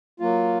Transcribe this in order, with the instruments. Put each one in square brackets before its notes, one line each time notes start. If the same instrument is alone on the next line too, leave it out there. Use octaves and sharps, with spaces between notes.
[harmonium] F#3 A#3 F4